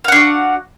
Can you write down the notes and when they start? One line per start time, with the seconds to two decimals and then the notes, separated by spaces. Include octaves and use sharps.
0.04 F5
0.08 F#5
0.12 D4
0.16 F#4